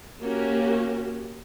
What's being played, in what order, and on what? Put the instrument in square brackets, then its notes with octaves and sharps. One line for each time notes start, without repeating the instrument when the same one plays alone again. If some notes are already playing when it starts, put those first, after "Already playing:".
[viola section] A#3 C#4 F#4 G4